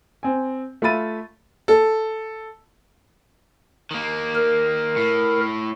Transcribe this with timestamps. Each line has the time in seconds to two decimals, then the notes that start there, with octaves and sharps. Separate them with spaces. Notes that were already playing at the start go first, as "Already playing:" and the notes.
0.23 C4 G#5
0.82 A3 F4 E5 B5 A6 D#7
1.68 A4
3.91 D#3 A#3
4.35 A#4
4.96 A2